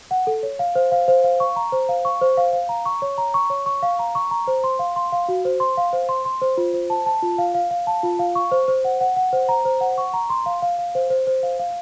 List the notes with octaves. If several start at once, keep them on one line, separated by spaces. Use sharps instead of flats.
F#5
A4
C#5
F5
C5
F5
C5
F5
C#6
A#5
C5
F5
C#6
C5
F5
F5
A#5
C#6
C#5
A#5
C#6
C#5
C#6
F5
A#5
C#6
A#5
C5
C6
F5
C6
F5
F#4
C5
C6
F5
C5
C6
C6
C5
F4
C5
A5
A5
F4
F5
F5
F5
A5
F4
F5
C#6
C5
C5
F#5
F#5
F#5
C5
A#5
C5
F#5
C#6
A#5
C6
F5
F5
F5
C5
C5
C5
F5
F5